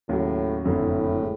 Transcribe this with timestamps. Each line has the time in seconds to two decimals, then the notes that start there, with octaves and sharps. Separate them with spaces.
0.09 D#2 A2 C#3 F#3
0.65 F#1 F2 A2 D3
1.21 G#3